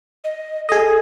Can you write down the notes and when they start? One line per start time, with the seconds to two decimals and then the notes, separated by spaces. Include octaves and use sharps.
0.24 D#5
0.69 G#4 A4 D#5